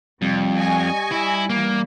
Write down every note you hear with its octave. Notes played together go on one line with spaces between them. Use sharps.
F2 C3 G3
D#5 G#5 C#6
E4
E3 A#3